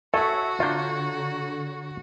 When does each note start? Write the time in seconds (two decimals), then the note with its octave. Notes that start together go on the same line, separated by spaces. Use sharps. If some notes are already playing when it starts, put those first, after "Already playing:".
0.14 F#4 A4 C#5 E5 G#5
0.60 D3 D4 F4 C#5 A#5 G6